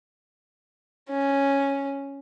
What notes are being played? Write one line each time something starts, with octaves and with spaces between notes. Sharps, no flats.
C#4